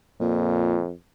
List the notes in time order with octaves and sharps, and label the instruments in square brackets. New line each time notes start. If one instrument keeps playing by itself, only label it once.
[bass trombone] F2 [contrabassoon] A#2